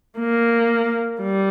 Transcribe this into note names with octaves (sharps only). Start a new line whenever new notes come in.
A#3
G3